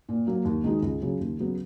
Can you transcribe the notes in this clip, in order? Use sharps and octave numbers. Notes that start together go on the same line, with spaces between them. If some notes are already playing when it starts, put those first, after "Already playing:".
A#2
F#3 A#3
D#2
D#3 G#3 D#4 F#4
C#2
C#3 F#3 C#4
D#2
C#3 F#3 B3